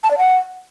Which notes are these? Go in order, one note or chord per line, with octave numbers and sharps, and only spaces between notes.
A5
D5
F#5